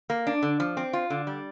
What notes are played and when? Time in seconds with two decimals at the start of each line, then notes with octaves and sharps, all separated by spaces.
0.10 A#3
0.27 D4
0.43 D3
0.60 F3
0.77 C4
0.93 F4
1.10 D3
1.27 G3